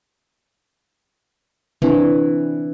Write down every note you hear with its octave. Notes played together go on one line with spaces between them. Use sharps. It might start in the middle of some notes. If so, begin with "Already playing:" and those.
E3 C4 D4